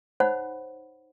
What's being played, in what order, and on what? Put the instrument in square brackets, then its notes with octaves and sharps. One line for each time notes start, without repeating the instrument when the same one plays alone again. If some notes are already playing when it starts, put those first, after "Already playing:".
[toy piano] D#4 C5 C#5 F#5 B5